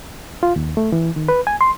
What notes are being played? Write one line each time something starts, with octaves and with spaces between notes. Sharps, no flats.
F4
D#2
A3
E3
D#3
B4
G#5
C6